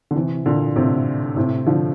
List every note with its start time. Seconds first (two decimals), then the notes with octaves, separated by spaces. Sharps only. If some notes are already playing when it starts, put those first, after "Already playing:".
0.11 D3
0.16 C3 E3
0.46 A#2 D3
0.76 A2 C3
1.36 A2 C3
1.66 D3 F3